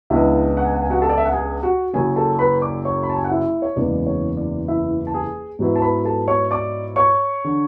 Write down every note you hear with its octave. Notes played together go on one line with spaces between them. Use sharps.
C#2 C#3 G#3 B3 D4 E4 E5
F#5
G#5
F#5
G#5
F#4 F#5
A4 A5
D5
E5
F#5
G#4 G#5
F#4 F#5
F#1 F#2 C#3 F#3 C#4 G#4 G#5
A4 A5
B4 B5
D5 D6
C#5 C#6
B5
A5
G#5
F#5
E4 E5
C#5
F#1 E2 C#3 E3 G#3 D5
C#5
D5
E4 E5
A5
G#4 G#5
G#2 F#3 B3 E4
A5
B4 B5
A4 A5
C#5 C#6
D5 D6
C#5 C#6
D3